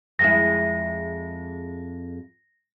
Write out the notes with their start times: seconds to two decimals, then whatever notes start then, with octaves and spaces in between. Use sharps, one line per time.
0.19 F2 G#3 E4 A#6